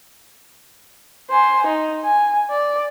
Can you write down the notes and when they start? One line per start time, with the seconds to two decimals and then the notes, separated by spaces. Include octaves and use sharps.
1.30 C5 G#5
1.67 D#4
2.04 G#5
2.51 D5